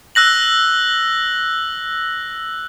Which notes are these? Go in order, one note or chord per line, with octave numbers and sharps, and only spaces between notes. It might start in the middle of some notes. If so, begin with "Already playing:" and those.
E6 F#6 A#6 F#7